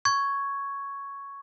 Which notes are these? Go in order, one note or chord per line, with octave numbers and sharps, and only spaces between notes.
C#6 G#6